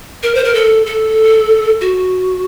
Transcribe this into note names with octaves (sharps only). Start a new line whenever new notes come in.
A#4
C5
A#4
A4
A4
F#4